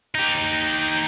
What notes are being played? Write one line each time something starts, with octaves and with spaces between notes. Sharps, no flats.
D#4 G4